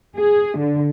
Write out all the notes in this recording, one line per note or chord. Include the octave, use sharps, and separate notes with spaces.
G#4
D3